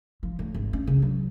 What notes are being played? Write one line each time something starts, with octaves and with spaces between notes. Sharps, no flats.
F3
A2
G#1
C#4
C#3
F#3